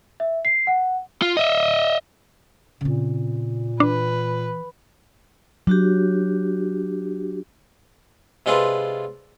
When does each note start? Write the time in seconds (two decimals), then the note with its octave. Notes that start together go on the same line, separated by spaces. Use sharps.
0.20 E5
0.45 C7
0.67 F#5
1.22 F4
1.37 D#5 E5
2.81 A#2 C#3 C4
3.80 E3 D4 B4
5.67 F#3 D4 F#4 G4
8.46 C3 G#3 D4 F4 A4 B4